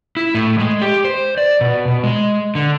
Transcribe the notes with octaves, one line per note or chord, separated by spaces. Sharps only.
E4
A2
G#3
G4
C5
D5
B2
B2
G#3
D3